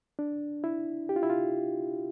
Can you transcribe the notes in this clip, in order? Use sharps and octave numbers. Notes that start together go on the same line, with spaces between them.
D4
E4
G4
F4
E4
F4